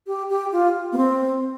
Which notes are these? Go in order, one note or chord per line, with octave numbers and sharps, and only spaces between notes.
G4
G4
F4
B3
C4